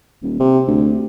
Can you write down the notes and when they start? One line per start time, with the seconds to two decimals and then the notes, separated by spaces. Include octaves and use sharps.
0.23 D#1
0.39 C3
0.67 D2